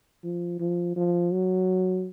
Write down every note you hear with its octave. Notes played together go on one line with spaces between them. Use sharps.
F3
F3
F3
F#3